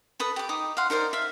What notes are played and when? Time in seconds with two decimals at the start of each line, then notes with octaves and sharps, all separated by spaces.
0.20 A4 B4 D#6
0.36 G4 D6
0.49 D#4 D6 D#6
0.77 F5 F#5 C6
0.90 D#4 A#4 C5 D5
1.13 E5 F5